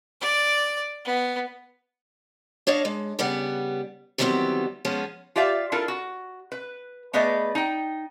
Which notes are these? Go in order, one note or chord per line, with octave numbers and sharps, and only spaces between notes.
D5
B3
D4 C#5 D#5 F5
G#3
C#3 G3 B3 F#5
D#3 E3 F#3 G3 B3 C4
F3 G#3 B3 C#4
F4 G4 D5 E5 F5
D4 E4 F4 A4 A#4
F#4
B4
A3 B3 G#4 B4 D5 D#5
D#4 G5